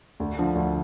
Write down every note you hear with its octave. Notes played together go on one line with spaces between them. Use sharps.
D2
D3 F3
D2